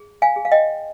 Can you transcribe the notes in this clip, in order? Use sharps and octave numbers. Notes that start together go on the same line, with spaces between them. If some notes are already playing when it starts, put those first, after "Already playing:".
Already playing: G#4
F5 G#5
G#4
F5
D#5 G5